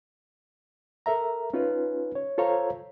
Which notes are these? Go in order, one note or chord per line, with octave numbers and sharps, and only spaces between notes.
A4 A#4 E5 A#5
C#4 D#4 F4 B4
C#5
F4 A4 C5 C#5 F5 A#5